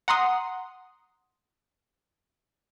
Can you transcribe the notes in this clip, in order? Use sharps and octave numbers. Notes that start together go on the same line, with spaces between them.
F#5 A#5 C6 D#6